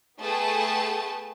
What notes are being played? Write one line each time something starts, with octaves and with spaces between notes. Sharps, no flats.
A3 B3 G#4 B4 G5 A5